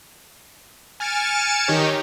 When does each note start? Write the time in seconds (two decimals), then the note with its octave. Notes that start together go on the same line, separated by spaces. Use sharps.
1.00 G#5 F6 A6 C#7 D7 E7
1.68 D#3 D#4 G4 C#5